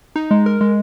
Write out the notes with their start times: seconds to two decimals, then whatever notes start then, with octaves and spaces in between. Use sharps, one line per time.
0.16 D#4
0.31 G#3
0.46 A#4
0.61 G#3